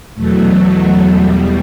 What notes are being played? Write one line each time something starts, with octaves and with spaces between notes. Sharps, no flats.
E2 B2 F#3 A3
E2 B2 G3